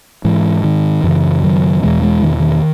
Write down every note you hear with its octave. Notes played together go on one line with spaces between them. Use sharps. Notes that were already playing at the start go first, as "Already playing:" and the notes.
G#2 E3
D#3
F#2 C#3 E3
D#3 F#3
E2 B2 E3 G#3
E3 G#3
D#3
D#3